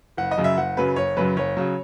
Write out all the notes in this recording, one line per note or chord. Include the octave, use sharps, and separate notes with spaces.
F#1 F#5
D#5
F#2 C#3 F#3
E5
F#1 F#5
F#2 C#3 F#3 B4
F#1 C#5
F#2 C#3 F#3 B4
F#1 C#5
C#3 F#3